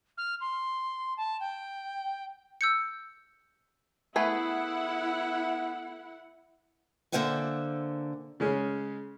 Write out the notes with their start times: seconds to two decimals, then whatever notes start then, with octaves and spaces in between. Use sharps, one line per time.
0.17 F6
0.40 C6
1.17 A5
1.40 G5
2.61 E6 G6 C#7
4.16 A3 B3 E4 G#4 B4 F#5
7.12 D3 A#3 C5 E5 F#5 G#5
8.40 C#3 G#3 C#4